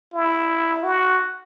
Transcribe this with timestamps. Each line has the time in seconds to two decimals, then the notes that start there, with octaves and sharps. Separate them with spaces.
0.13 E4
0.84 F#4